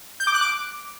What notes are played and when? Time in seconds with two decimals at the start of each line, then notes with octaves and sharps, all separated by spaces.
0.20 G6
0.27 D6
0.34 F#6
0.41 D6